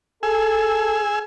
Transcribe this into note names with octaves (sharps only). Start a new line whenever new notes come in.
G#4 A4 G#5 E6